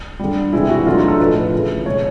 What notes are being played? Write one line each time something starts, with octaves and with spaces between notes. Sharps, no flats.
D3 G3
C3 E3 G#3 E4
F#4
D3 F#3 A3 F4
D#4
A4
A2 F3 A3 B4
C#3 E3 A3
B2 G#3 C#5